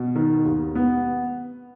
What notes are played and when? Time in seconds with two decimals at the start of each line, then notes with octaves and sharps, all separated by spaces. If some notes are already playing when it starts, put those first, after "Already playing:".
Already playing: B2
0.16 D#3
0.45 D#2
0.75 B3